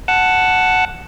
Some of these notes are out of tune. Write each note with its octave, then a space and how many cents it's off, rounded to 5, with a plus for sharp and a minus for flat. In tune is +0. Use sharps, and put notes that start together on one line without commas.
F#5 +0 A5 +0